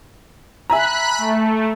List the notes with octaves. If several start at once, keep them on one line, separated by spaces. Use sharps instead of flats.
E5 G#5 A#5 B5 F#6
A3